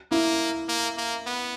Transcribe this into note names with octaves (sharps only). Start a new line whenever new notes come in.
A#3 E4
A#3
A#3
B3